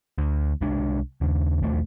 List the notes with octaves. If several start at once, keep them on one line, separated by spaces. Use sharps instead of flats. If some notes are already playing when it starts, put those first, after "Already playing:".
D2
C2 G#3 D4
D#2 C#3
E1 D#2 A3